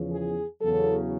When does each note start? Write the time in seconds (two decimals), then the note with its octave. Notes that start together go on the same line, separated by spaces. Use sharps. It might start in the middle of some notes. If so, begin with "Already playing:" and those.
Already playing: E2 C#3 F3
0.11 G#4
0.61 E2 C#3 F#3 A4